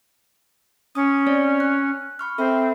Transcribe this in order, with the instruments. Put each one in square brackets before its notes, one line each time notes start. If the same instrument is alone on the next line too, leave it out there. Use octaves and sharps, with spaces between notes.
[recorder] C#4 [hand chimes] D#6
[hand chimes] C4 C#5 D5
F#6
B5 C#6 F6
[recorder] C4 [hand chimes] A4 E5 B5